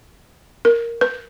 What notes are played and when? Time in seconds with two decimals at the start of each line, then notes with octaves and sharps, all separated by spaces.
0.65 A#4
1.01 B4